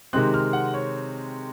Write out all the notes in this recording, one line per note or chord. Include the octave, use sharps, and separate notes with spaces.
C3 D#3 G#3 C4 F#6
F6
F#5
C#5